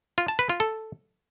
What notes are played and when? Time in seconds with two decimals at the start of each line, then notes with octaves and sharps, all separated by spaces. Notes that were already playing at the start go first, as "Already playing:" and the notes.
0.18 F4
0.28 A5
0.39 B4
0.49 F4
0.60 A4